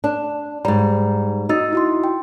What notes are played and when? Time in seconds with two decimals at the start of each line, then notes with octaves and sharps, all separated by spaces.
0.04 D4
0.65 G#2 G3 A#5
1.49 D#4 F#4 E6 A6
1.73 E4 F#4 C6
2.04 G5